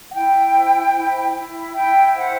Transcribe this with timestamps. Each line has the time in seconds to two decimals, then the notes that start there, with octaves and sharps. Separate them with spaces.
0.10 F#5
0.13 E4 G5
0.54 C5
0.95 E4
1.35 E4
1.76 E4 G5
2.16 C5 F#5